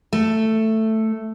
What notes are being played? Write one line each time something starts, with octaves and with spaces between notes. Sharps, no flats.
A3